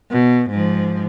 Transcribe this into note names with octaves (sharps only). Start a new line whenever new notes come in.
B2
G#2 F3